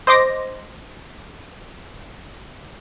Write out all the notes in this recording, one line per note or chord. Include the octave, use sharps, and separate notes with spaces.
C5 D#5 C6 D6 A#6